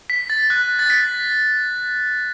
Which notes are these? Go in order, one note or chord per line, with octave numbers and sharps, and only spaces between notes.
B6
A6
F#6
A6
B6